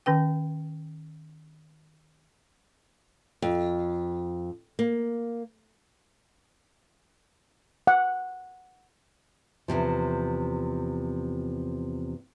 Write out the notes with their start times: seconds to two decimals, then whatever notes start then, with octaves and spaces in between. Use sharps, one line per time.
0.06 D#3 C#4 B4 G5
3.42 F2
4.79 A#3
7.87 F#5
9.68 E2 G2 C3 F3